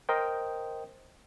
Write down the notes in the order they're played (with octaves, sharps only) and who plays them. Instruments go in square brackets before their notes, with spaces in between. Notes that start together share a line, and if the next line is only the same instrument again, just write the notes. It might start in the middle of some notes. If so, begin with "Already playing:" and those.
[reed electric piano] A#4 C5 D#5 G5